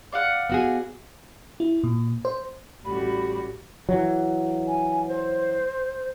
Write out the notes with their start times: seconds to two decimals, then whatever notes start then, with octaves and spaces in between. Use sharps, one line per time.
0.12 D5 F5 F#5
0.50 B3 F#4 G#4
1.60 E4
1.84 A#2
2.25 C5
2.85 A1 G3 F#4 G4 B5
3.89 E3 F#3
4.68 G#5
5.08 C5